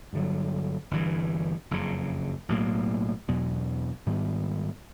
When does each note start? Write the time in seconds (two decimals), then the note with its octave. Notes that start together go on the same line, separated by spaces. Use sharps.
0.13 G2 D3 F#3
0.91 G1 G2 E3
1.71 F#1 F2 C#3
2.49 B1 A2 F#3 A#3
3.28 E2 B2 F#3 B3
4.06 G#2 D#3 G3 B3